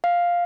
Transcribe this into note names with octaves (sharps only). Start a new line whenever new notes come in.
F5